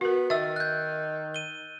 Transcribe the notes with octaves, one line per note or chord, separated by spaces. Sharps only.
B3 F#4 A#4
D#3 E5 E6 A6
F#6 G6
D#7 G7